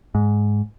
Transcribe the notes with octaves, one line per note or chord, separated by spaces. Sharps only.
G#2